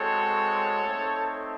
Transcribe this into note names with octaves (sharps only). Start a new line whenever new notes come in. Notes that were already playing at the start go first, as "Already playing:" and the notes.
Already playing: G#3 C4 F#4 A4 C#5
A3 C4 D#4